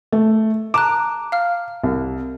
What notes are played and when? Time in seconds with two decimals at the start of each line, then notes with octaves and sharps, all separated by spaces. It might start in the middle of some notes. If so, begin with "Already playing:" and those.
0.12 A3
0.74 A5 A#5 D6 F#6
1.32 F5 F6
1.84 C2